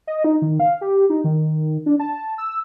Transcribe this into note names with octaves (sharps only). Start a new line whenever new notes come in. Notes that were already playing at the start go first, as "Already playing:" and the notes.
D#5
D#4
D#3
F5
G4
D#4
D#3
D4
A5
E6